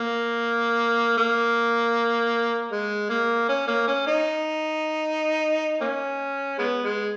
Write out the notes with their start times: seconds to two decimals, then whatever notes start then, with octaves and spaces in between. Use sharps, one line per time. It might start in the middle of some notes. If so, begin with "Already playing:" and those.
Already playing: A#3
1.17 A#3
2.72 G#3
3.10 A#3
3.49 C#4
3.68 A#3
3.88 C#4
4.07 D#4
5.81 A#3 C#4
6.58 G#3 B3
6.84 G#3